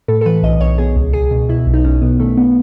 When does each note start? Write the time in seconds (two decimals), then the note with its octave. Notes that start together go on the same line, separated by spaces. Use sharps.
0.08 A2 A4
0.21 A4
0.26 E3 B4
0.43 B1 D#5
0.61 B1 C#5
0.78 B2 G#4
0.96 C#2
1.13 C#2 G#4
1.31 B2
1.49 B2 E4
1.67 B1
1.74 D#4
1.84 B1 C#4
2.02 B2 B3
2.19 D#3 A3
2.37 B3